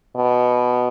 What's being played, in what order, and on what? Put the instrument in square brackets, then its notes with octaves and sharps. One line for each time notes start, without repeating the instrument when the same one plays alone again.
[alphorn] B2